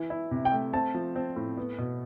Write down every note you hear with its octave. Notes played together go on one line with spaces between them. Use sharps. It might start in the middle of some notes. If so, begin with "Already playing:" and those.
Already playing: E3 E4
E4
C3
G5
A3
C4 A5
F3
C4
A2
B3
B2